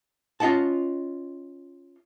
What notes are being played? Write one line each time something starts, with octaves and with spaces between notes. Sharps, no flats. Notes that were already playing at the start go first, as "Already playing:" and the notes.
C#4 F4 D#5 F#5 A5